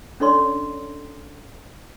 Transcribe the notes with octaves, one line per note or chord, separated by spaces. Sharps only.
C#4 D4 A4 C#5 D5 C6